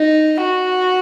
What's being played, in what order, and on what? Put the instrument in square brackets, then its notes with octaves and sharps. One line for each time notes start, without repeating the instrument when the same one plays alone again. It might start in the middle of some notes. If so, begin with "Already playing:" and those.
Already playing: [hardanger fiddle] D#4
F#4